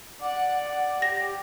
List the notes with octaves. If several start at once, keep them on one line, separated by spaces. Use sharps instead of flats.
D5 F#5
F#5
G4 A#6